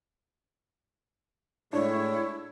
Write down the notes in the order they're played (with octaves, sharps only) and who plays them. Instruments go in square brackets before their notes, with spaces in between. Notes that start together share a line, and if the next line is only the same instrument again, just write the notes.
[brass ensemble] A2 G#3 [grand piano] D4 [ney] E4 [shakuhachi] C#5